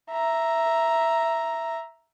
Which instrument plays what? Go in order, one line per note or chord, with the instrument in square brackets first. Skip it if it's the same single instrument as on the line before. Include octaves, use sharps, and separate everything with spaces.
[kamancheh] E5 A#5